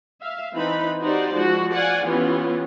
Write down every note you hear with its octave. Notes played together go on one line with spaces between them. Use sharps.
E5 F5
E3 C4 D#4 B4 B5
D#4 F#4 G4 C5 D5
F3 G#3 F#4
D5 F5 F#5 G#5
E3 B3 C#4 F4 G4